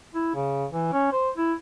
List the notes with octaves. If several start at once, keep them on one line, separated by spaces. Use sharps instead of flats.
E4
C#3
E3
C#4
C5
E4